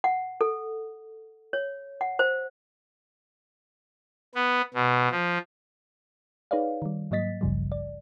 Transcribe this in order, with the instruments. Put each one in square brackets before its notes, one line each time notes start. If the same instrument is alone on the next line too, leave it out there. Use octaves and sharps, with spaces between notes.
[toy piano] F#5
A4
C#5
F#5
C5
[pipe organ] B3
B2
F3
[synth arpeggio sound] D#4 G#4 B4 C#5 D5 F5
D#3 G3
G#2 F#3 A#3 D#5 A6 B6
G#1 C#2 G2 C#3 F3 G3
D5